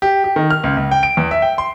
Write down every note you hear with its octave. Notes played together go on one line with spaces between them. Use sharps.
G4
G4
D#3
F6
C#2
C#2
G5
D7
E2
E5
G5
C6